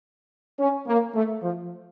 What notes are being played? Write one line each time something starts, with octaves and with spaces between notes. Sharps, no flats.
C#4
A#3
A3
F3